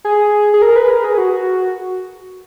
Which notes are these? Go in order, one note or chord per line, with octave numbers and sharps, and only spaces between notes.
G#4
G#4
A#4
B4
A#4
G#4
F#4